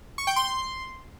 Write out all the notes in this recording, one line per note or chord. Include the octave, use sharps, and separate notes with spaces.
C#6
G5
C6